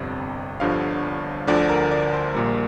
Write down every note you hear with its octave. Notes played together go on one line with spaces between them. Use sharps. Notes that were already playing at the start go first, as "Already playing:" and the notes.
Already playing: G1 F2 C3 D5
G1 G2 D3 F3 F5
D2 D3 F3 D5
A#4
D5
C5
A#1 A#2 G3 A#4